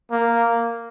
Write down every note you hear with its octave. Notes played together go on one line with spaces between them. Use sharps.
A#3